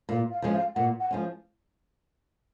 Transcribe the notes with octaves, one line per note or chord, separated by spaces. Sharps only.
A#2 F5
F5
F3 G#3 C#4
F5
A#2 F#5
F#5
F3 G#3 C#4